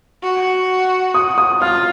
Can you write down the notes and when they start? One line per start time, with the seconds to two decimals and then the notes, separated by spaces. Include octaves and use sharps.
0.23 F#4
1.14 D#6
1.38 D#6
1.61 F4 F6